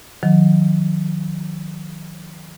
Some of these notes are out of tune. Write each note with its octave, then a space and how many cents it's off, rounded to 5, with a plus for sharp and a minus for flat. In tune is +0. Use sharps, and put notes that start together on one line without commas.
D#3 +0 F#3 -40